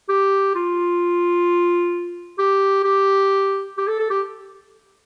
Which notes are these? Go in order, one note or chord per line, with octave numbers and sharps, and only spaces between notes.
G4
F4
G4
G4
G4
A4
A4
G4